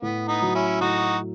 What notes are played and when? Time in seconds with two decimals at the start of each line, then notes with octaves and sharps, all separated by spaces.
0.02 A2 B3
0.28 B3 D#4
0.42 F#3
0.55 C#4 E4
0.81 A2 D#4 F#4